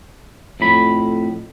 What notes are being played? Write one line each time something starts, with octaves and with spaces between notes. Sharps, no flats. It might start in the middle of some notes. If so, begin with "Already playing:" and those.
F2 A2 B5